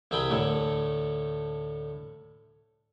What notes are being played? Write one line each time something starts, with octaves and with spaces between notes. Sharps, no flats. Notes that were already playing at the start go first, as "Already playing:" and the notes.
C2 C4 G#4 G5 B5
D2 A2 A3